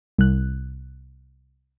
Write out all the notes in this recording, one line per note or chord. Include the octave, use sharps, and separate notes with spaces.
C2 F#6